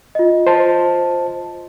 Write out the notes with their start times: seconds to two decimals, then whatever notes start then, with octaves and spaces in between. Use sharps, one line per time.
0.15 F4 D#5
0.47 C5 A5